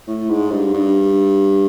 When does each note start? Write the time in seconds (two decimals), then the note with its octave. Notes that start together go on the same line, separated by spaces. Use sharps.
0.08 A2
0.30 G#2
0.51 G2
0.74 G2